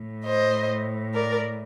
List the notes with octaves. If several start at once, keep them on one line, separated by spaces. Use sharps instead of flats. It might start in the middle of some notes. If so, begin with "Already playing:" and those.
Already playing: A2
C5 D#5
A#4 D5